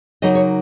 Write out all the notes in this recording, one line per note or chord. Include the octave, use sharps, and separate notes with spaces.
C#3 F#3 A#3 D#4 D#5
C#5